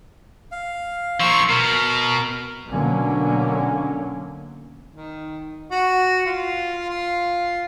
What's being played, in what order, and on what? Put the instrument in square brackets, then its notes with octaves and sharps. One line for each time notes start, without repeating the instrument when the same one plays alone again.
[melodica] F5
[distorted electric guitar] F3 A#3 [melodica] C6 C#6 E6
[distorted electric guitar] B2 [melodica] A#4
[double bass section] B2 D3 F#3 A#3 C#4
[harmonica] D#3
F#4
F4
F4